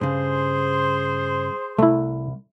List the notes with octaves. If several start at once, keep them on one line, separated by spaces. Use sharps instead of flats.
G2 C#3 G#4 C5
C2 A3 E4